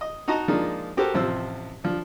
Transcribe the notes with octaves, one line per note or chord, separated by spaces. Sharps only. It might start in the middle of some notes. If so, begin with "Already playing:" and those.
D#5
D#4 F#4 D#5 A5 A#5
F3 G#3 A#3 D4 D#4
F#4 G4 A4 A#4 C5
A1 C3 F3 C5 E6
F3 D4